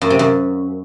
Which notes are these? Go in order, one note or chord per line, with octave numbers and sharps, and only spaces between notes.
F#2
C3
F#2